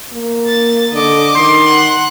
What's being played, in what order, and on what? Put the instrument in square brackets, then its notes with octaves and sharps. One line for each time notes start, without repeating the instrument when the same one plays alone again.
[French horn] A#3
[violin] A6
[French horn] D3 [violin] D#5 D6
[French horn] D#3 [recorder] C6
[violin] F#5 F#6